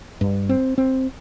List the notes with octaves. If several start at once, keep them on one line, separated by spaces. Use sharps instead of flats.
G2
C4
C4